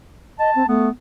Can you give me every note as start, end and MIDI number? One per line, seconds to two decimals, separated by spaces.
0.39 0.51 75
0.39 0.66 81
0.56 0.66 60
0.68 0.89 57
0.68 0.89 59